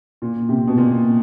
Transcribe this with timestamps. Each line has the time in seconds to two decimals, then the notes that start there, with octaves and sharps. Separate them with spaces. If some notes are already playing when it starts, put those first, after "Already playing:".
0.22 A#2
0.49 C3
0.67 B2
0.77 A#2